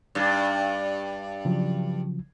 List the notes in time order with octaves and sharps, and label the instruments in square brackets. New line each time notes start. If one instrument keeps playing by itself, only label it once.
[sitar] G2 D4
[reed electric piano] C#3 F3 F#3